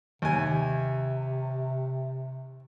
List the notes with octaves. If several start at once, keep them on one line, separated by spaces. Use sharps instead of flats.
D#2 C3 G#5